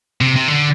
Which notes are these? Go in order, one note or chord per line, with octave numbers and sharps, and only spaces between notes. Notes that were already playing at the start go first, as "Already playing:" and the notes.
C3
C3
D3